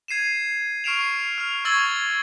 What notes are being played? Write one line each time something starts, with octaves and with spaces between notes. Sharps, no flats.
G#6 C7 D#7 E7
C#6 F6 C7 D7 E7 F7
F6 F7
C#6 E6 G#6 A6 F#7 G7